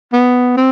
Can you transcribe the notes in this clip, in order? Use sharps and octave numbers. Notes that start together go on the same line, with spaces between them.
B3
C4